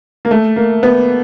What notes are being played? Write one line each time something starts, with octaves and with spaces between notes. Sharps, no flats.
A#3
A3
A#3
B3